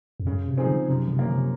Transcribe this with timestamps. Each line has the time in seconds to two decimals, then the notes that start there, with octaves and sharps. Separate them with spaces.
0.20 F2
0.26 F#2 C#3
0.48 C3
0.57 F3 C4 D#4 G#4
0.67 C#3
0.88 F#2 C3
1.08 C3
1.19 F3 A#3 C#4
1.29 C3